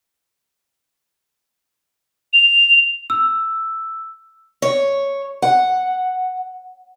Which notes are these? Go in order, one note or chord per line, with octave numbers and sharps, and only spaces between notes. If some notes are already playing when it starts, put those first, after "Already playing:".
F7
E6
C#5
F#5